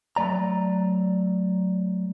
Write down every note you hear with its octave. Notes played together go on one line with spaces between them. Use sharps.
F#3 A3 D5 A#5